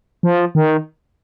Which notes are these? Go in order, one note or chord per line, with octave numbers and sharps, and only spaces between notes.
F3
D#3